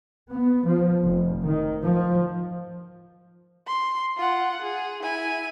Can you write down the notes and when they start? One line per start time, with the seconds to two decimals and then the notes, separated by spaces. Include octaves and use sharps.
0.30 B3
0.67 F3
1.02 F1
1.43 D#3
1.82 F3
3.67 C6
4.17 F4 F#5
4.62 G#4
5.03 E4 G#5